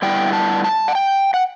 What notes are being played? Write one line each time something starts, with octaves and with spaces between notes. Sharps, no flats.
D3 G3 B3 E4 G5
A5
A5
F#5
G5
F#5